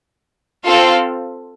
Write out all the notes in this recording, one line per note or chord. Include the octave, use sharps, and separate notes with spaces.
C4 F4 A4 F5